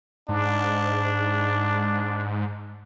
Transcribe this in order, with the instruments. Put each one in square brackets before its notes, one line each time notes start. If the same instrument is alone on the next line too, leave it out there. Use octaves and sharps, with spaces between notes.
[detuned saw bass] G#2 [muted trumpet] D4